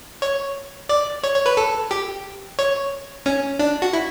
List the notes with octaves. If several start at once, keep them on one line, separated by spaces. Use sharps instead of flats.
C#5
D5
C#5
C#5
B4
A4
G4
C#5
C#4
D4
F#4
E4